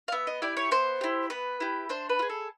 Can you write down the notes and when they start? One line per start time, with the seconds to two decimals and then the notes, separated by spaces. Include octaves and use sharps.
0.08 F5
0.12 B3 E5
0.27 D#5
0.42 E4 G4 D5
0.57 C#5
0.71 B3 C5
1.01 E4 G4
1.30 B3 B4
1.60 E4 G4
1.89 D4 C5
2.09 B4
2.19 F4
2.22 G#4
2.29 A4